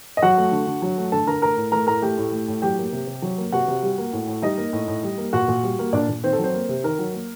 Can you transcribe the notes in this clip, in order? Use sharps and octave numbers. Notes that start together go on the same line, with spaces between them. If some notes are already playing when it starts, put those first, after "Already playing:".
D#5
F#3 F#4 F#5
A3
D3
D3
F#3
A3
D3 A4 A5
D3 A#4 A#5
A3 A#4 A#5
A2
A3 A#4 A#5
A2 A#4 A#5
A3 G4 G5
A2
A3
A2
F#3 G4 G5
A#3
C3
C3
F#3
A#3
C3 F#4 F#5
C3
G3
A#3
A2
A2
G3 D#4 D#5
A#3
A2
A2
G3
A#3
A#2 F#4 F#5
A#2
G3
A#3
A#2 D4 D5
A#2
D#3 C4 C5
A4
F#3 C4 C5
A#3
C3
D#3 A#4
F#3
A#3